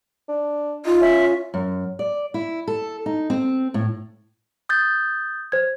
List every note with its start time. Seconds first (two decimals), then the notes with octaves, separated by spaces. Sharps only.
0.29 D4
0.86 D#4 F4
1.01 C#4 E5
1.54 F#2
1.99 D5
2.34 E4
2.68 A4
3.06 D#4
3.30 C4
3.74 A2
4.69 D#6 G6 A6
5.52 C5 G#6